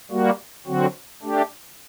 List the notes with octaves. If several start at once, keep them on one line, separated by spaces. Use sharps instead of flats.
G3 A#3 F#4
D3 F#3 C4 F#4
A3 D4 G4